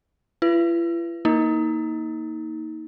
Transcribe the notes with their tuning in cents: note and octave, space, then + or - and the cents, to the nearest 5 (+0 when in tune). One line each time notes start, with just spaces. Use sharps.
E4 +45 B4 +0
A#3 +0 D#4 +25